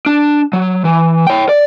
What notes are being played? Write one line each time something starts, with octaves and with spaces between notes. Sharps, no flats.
D4
F#3
E3
C#5 G5
D5